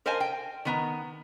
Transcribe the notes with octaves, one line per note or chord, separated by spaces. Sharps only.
A#4 C5 D#5 F5 G#5 A5
G5
D#3 B3 A#5